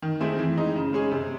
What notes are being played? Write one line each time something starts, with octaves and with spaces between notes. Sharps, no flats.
D#3
A3 C4 E4 G#4
E3
G#3 D#4
C#3
G#3 C#4 G#4
C3